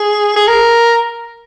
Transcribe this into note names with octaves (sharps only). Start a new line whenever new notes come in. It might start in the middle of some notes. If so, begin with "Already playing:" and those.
Already playing: G#4
G#4
A#4